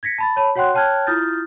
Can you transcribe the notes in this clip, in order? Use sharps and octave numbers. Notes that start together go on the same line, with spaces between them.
G#6 A#6 B6 C#7
A5 B5 A6
C#5 A5 B5
F#4 C#5 F#5 G5 C6 F#6
C#5 G5 A5 F6 F#6 G#6
E4 F4 D#6 F6 G6 A6